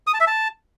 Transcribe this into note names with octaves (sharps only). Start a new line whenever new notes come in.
D#6
A5
E5
A5